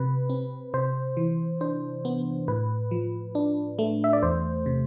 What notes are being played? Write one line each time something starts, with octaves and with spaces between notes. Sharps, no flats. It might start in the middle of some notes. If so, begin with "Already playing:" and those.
Already playing: C3 B4
C4
C3 C5
E3
D4 C5
B3
A2 B4
F3
D4
A3
E5
D5
E2 C5
C3